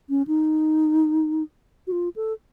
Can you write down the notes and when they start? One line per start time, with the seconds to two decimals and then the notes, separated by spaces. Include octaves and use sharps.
0.10 C#4
0.27 D#4
1.87 F#4
1.92 F4
2.16 A4